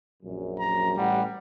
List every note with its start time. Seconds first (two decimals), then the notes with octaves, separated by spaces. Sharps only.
0.23 A#1 F#2
0.59 A#5
0.97 A1 G3 C#4 F#5